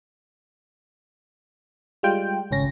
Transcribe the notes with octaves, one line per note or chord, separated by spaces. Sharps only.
G3 G#3 F4 G5
G#1 C#2 C#4 A#6